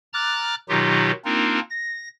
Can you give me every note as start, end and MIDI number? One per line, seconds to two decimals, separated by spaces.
0.13 0.55 82
0.13 0.55 86
0.13 0.55 89
0.13 0.55 90
0.13 0.55 93
0.69 1.11 47
0.69 1.11 51
0.69 1.11 54
0.69 1.11 63
0.69 1.11 65
0.69 1.11 67
1.25 1.59 58
1.25 1.59 60
1.25 1.59 62
1.25 1.59 63
1.25 1.59 65
1.25 1.59 70
1.70 2.08 94